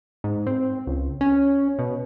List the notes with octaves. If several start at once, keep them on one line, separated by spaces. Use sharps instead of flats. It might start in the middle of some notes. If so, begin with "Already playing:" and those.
G#2
C4
C#2
C#4
B2